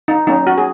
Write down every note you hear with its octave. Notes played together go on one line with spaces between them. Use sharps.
D#4
F#3 A#3 C#4 D#4
F#4
G#4